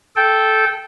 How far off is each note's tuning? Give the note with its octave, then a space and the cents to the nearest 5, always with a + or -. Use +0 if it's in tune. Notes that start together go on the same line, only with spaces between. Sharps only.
A4 -10 G5 -5